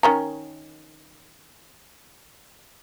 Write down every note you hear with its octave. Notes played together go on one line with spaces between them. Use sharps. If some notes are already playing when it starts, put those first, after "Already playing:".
D#3 C#4 A#5